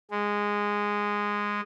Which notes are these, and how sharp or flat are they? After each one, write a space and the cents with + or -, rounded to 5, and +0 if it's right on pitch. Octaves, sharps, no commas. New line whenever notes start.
G#3 -10